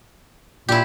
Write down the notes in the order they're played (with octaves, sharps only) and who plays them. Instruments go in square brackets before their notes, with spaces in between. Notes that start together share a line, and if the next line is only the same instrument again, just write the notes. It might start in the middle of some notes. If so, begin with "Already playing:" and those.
[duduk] A#2 [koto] E4 G4